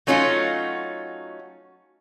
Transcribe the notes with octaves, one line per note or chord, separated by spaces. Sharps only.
F#3 A3 C#4 D#4 F4 F#4